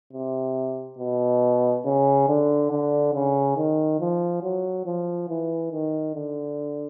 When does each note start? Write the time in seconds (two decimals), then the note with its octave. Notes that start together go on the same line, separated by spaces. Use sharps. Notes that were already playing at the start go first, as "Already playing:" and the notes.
0.13 C3
0.99 B2
1.85 C#3
2.28 D3
2.71 D3
3.14 C#3
3.57 D#3
4.00 F3
4.43 F#3
4.85 F3
5.29 E3
5.72 D#3
6.15 D3